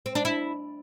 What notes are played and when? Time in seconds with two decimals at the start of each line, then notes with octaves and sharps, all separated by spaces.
0.06 C4
0.15 D4
0.25 E4